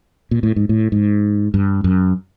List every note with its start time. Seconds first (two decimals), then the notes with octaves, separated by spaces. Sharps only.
0.31 A#2
0.43 A2
0.56 G#2
0.69 A2
0.92 G#2
1.54 G2
1.84 F#2